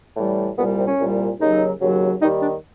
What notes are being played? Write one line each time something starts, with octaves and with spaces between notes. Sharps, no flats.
A2 E3 G3
C2 A#2 G3 B3
C4
C#4
C2 A#2 G3
D#2 C#3 F#3 D#4
D#2 C#3 F#3
D#2 D#3 G3 D#4
D4